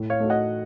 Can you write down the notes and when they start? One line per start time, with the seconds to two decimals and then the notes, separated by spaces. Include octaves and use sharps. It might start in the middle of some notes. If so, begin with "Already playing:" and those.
Already playing: A2
0.10 C#5 F5
0.20 A3 D#4 F#4
0.30 D#5 F#5